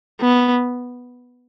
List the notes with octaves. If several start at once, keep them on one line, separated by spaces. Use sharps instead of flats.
B3